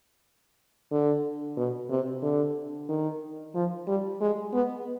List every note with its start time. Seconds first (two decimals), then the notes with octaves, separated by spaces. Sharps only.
0.91 D3
1.57 B2
1.90 C3
2.22 D3
2.89 D#3
3.55 F3
3.88 G3
4.21 G#3
4.53 B3